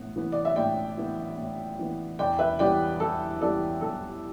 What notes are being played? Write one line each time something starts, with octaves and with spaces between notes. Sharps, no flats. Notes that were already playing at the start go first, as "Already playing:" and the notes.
Already playing: A2 E3 B3
E3 B3
D5
E5
A2 D5 G5
E3 B3
A2
E3 B3
E2 D5 G5
B4 E5
E3 G3 B3 D5 G5
E2 A4
E3 G3 B3 A4 D5
E2 A4